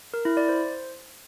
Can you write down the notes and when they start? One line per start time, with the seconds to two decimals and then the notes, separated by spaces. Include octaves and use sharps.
0.14 A#4
0.25 E4
0.37 D5
0.49 C5